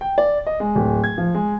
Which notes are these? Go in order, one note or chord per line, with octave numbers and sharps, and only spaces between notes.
G5
D5
D#5
G#3
D1
G#6
F3
G#3